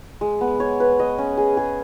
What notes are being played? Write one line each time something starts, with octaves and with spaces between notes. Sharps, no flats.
G#3
B3
C#5
B4
D#5
C#4
G#4
G#4